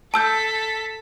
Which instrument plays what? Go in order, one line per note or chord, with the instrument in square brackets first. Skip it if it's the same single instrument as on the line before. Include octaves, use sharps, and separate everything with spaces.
[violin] A4 B6 [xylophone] A5 E6 G6